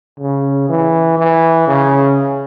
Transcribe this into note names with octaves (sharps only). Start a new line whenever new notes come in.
C#3
E3
E3
C#3